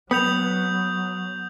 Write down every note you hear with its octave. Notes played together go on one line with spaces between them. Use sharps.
F#3 B3 D#6 G6 F7